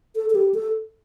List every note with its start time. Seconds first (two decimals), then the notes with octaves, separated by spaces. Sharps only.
0.16 A4
0.30 A4
0.35 G4
0.54 A4